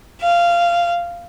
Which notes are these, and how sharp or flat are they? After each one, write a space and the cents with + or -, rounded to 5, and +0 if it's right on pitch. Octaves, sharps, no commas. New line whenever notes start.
F5 -15